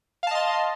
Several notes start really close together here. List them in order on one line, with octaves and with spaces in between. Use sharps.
F5 A5 D#5 C6